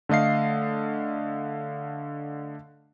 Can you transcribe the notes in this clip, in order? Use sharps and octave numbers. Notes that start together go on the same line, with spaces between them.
D3 A3 D#5 F5 C7